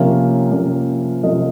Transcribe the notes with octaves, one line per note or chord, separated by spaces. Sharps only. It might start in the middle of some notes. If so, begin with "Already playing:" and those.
Already playing: C3 F3 A#3 C#4 F5
C3 F3 A#3 C#4
C3 F3 A#3 C#4 D#5